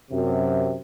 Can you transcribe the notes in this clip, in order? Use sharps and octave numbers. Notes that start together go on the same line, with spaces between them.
F#2 C3